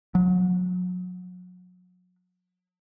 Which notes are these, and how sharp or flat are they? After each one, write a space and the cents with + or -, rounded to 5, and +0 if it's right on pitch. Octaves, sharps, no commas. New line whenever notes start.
F#3 -35